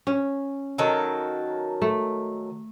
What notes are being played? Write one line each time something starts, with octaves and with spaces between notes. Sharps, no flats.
C#4
D#3 F#3 A4
A3